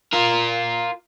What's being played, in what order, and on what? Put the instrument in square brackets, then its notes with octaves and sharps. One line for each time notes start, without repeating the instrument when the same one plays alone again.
[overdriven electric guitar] F4 A#4